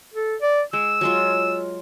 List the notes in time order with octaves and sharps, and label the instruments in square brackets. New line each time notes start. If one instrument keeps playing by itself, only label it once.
[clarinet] A4
D5
[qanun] G#3 [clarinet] E6
[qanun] F#3 G#3 F4